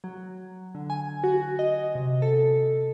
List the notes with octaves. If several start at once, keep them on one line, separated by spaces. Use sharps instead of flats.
F#3
D3
G#5
F#4
D#5
C3
A4